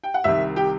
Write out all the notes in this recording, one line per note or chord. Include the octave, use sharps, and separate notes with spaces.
G5
F#5
C2 C3 D#3 E5
G4 G5